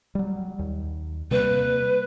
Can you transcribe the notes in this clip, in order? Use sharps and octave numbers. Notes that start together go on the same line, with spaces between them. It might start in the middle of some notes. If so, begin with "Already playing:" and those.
F#3 G3
D#2
C3 G3 A#3 B4